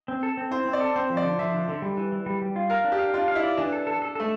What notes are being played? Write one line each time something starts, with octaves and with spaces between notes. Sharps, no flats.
C4
A4
C4
E4 C5
C4
D5
A4
C4 C5
F3
D5
D3
F3 E5
D3
D3
G3
E3
E3
G3
G3
F4
A#4 F5
D4
G4
F5
D4 F4
F5
E4
D5
E3 D4
A4
A4
A4
A3 A4